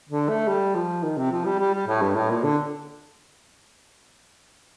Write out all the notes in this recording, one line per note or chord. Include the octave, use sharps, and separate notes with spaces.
D3
A3
G3
F3
D#3
C3
F3
G3
G3
G3
A2
G2
A2
A#2
D3